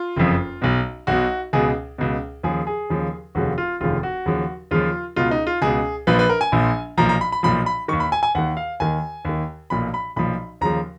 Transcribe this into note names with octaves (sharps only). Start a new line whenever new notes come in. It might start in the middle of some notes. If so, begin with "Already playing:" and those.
Already playing: F4
F#1 F2 F3
B1 B2
B1 B2 F#4
C#2 B2 G#4
C#2 B2
D#2 C#3 F3 G#4
G#4
D#2 C#3 F3
F1 D#2 C#3 F3 F#4
F4
F1 D#2 C#3 F3 F4
F#4
D#2 C#3 F3
D#2 C#3 F3 F4
C#2 B2 F4
D#4
F4
C#2 B2 G#4
A#1 A#2 F3 B4
B4
A#4
G#5
A#1 A#2 F3
B1 A#2 F3 A#5
A#5
B5
B5
B1 A#2 F3 B5
B5
D#2 D#3 C#6
B5
G#5
G#5
D#2 D#3 F#5
F5
D#2 D#3 G#5
D#2 D#3
B1 A#2 F3 B5
B5
B1 A#2 F3 B5
D#2 C#3 F3 A#5